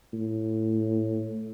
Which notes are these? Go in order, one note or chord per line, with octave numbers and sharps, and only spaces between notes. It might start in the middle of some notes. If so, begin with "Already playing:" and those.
A2